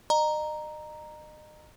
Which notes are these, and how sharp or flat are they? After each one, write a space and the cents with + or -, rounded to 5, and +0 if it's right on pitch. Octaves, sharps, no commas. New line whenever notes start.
D#5 -35 A#5 +0